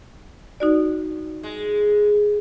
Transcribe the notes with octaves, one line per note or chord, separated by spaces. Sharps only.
D#4 F#4 D5
G#3